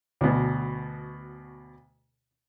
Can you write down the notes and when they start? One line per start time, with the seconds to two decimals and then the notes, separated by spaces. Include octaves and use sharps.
0.21 D2 B2